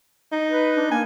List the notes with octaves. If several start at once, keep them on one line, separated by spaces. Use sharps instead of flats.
D#4
B4
D4
A#3 G#5